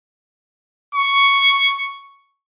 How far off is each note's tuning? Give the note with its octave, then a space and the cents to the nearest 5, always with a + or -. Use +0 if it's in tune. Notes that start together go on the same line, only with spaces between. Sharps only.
C#6 +5